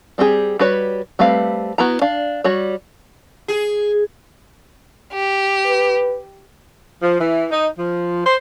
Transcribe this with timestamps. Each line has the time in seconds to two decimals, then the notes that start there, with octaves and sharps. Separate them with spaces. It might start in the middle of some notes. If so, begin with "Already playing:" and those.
0.18 G3 C4 G4 G#4
0.59 G3 F#4 B4 C#5
1.19 G3 A3 C4 B4 F5
1.78 B3 E4 F#4 A#5
2.02 D4 F5
2.44 G3 F#4 C#5
3.48 G#4
5.13 G4
5.66 B4
7.01 F3
7.18 E3
7.50 D#4
7.76 F3
8.25 C5